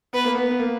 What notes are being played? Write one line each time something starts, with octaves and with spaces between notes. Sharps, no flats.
B3 B4
A#3
B3
B3
A#3